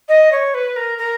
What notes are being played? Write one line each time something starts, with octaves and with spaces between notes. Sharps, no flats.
D#5
C#5
B4
A#4
A#4